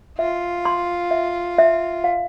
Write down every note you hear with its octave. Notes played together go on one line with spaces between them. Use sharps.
F4 E5
C6
E5
E5
F5